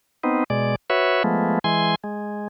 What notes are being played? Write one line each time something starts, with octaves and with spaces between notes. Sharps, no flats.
B3 C4 D#4
B2 G#3 D5
F#4 B4 C#5 E5
F3 G#3 A3 B3
E3 G#3 G#5 C6
G#3